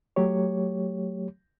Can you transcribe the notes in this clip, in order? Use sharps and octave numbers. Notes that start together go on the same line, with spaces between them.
F#3 A3 G4 C#5